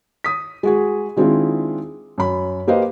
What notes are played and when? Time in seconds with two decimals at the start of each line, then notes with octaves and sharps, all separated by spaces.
0.24 D#6 B6
0.63 G#3 F#4 G#4
1.17 D#3 G#3 C4 D4 E4 F4
2.18 F#2 B5
2.67 A#3 G4 B4 C5 D#5 F5